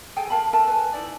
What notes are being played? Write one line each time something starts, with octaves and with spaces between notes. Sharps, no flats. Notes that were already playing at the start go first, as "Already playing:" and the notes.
G#4 A4 G5 G#5
A#4 F5 A5 B5
A4 A#4 E5 A5
B4 G#5
D#4 E4 D5